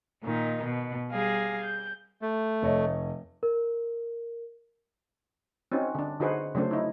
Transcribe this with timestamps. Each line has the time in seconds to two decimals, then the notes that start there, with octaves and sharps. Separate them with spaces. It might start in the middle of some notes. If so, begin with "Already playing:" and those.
0.23 A#2 D#3 D#4
0.64 B2
1.11 G3 G#4 F5 G#5 A#6
1.63 G6
2.22 A3
2.62 F1 C#5 D#5
3.43 A#4
5.72 C4 C#4 D#4 F#4
5.95 D3 D4
6.20 D3 D#4 F#4 G#4 B4 C5
6.55 C#3 F#3 A3 D4 C5
6.71 D#4 E4